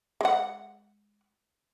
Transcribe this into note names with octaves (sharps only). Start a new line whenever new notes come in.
G#3 F#5